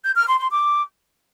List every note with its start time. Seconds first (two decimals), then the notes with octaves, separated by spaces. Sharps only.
0.04 G6
0.16 F6
0.27 C6
0.39 C6
0.51 D6